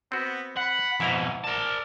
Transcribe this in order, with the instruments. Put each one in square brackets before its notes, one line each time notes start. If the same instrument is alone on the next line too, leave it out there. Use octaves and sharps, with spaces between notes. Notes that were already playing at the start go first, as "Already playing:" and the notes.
[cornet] B3 [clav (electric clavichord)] C4 F#4
[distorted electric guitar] F#5 [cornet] B5
[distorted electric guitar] F2 B2 [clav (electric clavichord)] G#2 E4 A#5
[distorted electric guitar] A#4 A5 [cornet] D5